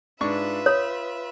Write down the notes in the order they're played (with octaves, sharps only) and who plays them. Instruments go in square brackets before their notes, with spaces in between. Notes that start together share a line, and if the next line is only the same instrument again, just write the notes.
[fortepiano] G#2 D4 C#6 [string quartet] F4 B4 E5
[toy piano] C#5 [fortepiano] D#6